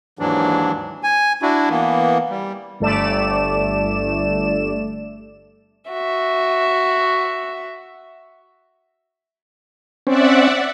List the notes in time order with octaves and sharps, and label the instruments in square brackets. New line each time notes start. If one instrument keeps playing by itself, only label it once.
[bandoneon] D#2 G#2 E3 F#3 D4
G#5
D4 E4 F#4
E3 A#3 B3
G3
[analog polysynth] G1 A3 D5 E7
[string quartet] F#4 E5
[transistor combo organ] C4 C#4 [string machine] D5 E5 F#5